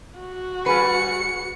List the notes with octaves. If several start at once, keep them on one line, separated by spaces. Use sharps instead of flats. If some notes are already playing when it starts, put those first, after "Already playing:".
F#4
G3 G#4 B4 C#7